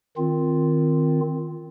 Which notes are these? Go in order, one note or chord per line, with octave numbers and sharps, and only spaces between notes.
D#3 C4 F4